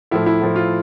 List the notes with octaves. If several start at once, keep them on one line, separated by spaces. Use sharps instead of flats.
A2 F3 A3 E4
E4
A2 F3 A3
F4